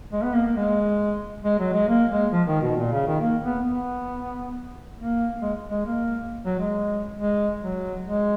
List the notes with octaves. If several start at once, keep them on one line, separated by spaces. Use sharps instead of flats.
G#3
B3
A#3
A#3
G#3
G#3
F#3
G#3
A#3
G#3
F3
D#3
B2
A#2
C#3
D#3
A#3
B3
B3
A#3
G#3
G#3
A#3
F#3
G#3
G#3
F#3
G#3